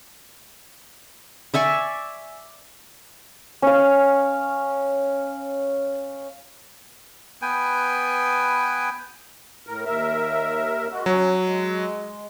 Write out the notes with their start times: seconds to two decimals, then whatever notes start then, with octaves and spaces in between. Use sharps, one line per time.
1.54 D5 E5 G#5 C#6
3.62 C#4 F5
7.42 B3 B4 G5 G#5
9.67 A2 A#4
9.86 D#2 A#4 E5
10.92 G#3 F#4
11.06 F#3 C#4
11.45 G#3